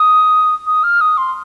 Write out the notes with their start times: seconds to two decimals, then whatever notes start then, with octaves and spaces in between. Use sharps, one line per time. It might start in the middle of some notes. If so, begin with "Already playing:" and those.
Already playing: D#6
0.66 D#6
0.84 F6
1.01 D#6
1.18 C6